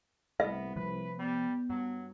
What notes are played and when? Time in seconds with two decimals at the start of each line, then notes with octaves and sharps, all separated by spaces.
0.40 C2 A3 B3 E5
0.76 C2 C3 F3 A3 B4
1.19 G3 B3
1.69 G2 F#3